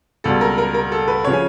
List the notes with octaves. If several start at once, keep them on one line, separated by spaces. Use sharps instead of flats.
C#2 B2 G3 A4
A#4
A#4
A#4
A4
B4
C#3 F3 C#5
G#5